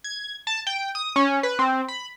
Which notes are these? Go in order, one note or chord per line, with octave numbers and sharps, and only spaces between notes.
G#6
A5
G5
D#6
C#4
B4
C4
B5